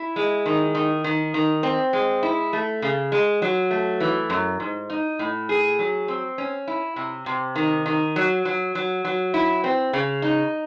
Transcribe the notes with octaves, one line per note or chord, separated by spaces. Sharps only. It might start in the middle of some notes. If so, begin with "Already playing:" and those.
Already playing: E4
G#3
D#3
D#3
D#3
D#3
C4
G#3
E4
A3
C#3
G#3
F#3
A3
E3
F#2
G#2
D#4
A2
G#4
F#3
C4
C#4
E4
C3
C3
D#3
D#3
F#3
F#3
F#3
F#3
E4
C4
C#3
D#4